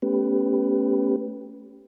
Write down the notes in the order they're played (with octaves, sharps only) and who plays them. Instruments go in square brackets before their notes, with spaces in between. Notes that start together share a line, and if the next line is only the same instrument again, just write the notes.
[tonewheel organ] A3 B3 C#4 G4 B4